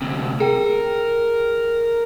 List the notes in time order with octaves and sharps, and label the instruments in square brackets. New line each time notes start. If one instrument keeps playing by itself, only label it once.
[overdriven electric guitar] D2 C3
[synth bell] G#4 G5 [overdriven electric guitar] A#4